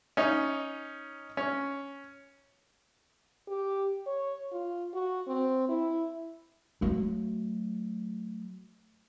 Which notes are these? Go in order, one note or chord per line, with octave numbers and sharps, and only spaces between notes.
C#4 D#4
C#4
G4
C#5
F4
F#4
C4
E4
F#3 A3